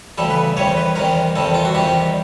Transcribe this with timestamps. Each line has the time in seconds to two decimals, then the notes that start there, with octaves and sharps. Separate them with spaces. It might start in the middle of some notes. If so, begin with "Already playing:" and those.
0.18 D2 C#3 E3 G3 A4
0.30 B4
0.57 E2 C3 D#3 G3 C#5
0.77 B4
0.95 E2 C3 D#3 G3 A#4
1.35 E2 C3 D#3 G3 A4
1.54 F4
1.65 F#4
1.74 E2 C3 D#3 G3 G4